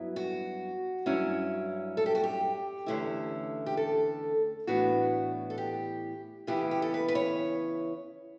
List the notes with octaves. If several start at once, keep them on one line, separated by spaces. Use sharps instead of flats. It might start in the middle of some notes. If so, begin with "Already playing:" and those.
Already playing: G2 F#3 B3 E4
F#4
G2 F#3 C#4 E4
A4
G4
F#4
G4
E2 D3 A3 C#4 E4
G4
A4
A2 E3 B3 D4 F#4
A4
G4
C#3 E3 B3 E4 G4
G4
A4
B4
B4
C#5